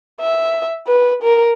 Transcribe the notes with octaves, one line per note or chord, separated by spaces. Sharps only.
E5
B4
A#4